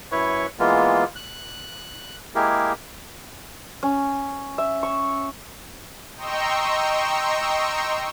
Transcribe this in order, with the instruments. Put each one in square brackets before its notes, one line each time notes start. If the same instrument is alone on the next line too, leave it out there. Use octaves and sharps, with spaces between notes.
[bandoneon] F#2 E4 B4 C#5 C#6
E3 G#3 A#3 B3 F4
F#6
G#3 A#3 E4 G4 G#4 A#4
[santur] C#4
E5
C#6
[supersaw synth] D#5 G5 A#5 C6 C#6 E6